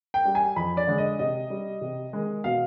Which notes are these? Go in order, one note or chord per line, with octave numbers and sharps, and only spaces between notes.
G5
G3
G#5
F2 B5
D5
D3 G#3
D#5
C3 D#5
G3
C3
D#3 G#3
B2 F5